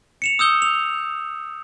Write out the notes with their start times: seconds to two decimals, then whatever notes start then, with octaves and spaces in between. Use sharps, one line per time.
0.22 C#7 E7 F7
0.39 D#6 E6 G6 G7
0.62 F7